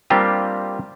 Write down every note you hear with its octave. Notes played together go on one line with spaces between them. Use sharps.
G3 A#3 C4 D4 F4 G4